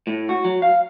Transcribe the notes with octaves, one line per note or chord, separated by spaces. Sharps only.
A2
F#4
F#3
F5